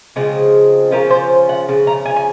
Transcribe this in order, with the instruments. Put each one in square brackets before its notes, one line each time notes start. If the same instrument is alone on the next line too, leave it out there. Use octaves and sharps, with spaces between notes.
[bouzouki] C#3 F3 G#3 C4
C#3 F3 C#4 A#4
C5
F#5
C#3 F3
A#5
G#5
G#5